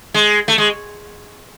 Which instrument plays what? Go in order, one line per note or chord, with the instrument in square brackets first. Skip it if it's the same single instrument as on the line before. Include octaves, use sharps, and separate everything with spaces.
[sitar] G#3
A3
G#3